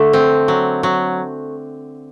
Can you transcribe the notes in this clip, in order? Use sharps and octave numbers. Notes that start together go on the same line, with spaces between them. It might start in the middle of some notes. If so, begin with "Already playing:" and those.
Already playing: D3 A3
C4
F#3
F#3